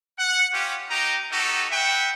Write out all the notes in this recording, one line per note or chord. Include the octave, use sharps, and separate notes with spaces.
F#5
C#4 F4 G4
D#4 G4 A#5
D#4 F#4 G4 A4
B4 E5 F#5 G5